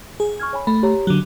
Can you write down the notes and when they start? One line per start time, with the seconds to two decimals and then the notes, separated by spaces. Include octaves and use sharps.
0.20 G#4
0.40 C#6 F6 G#6
0.53 C#5 G#5 B5
0.67 A3 B5
0.83 G4 C#5 A#5
1.07 D3 F#3